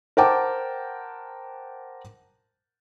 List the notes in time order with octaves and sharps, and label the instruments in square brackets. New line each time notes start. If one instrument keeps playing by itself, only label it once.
[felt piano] A#4 C5 F#5 G5 A5 D6